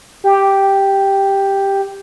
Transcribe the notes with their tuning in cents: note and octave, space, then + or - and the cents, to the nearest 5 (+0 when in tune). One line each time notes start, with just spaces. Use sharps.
G4 +0